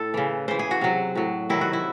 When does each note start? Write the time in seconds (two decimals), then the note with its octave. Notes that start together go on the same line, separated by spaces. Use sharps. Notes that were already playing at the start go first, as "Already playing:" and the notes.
Already playing: A2 A4
0.14 C#3 E3
0.48 C#3 E3 C5
0.59 G#4
0.71 F#4
0.81 C3 F#3
1.15 A2 F#3
1.49 C3 D#3 F#3 E4
1.61 F#4
1.73 E4